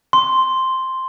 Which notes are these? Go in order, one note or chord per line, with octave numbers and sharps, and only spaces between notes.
C6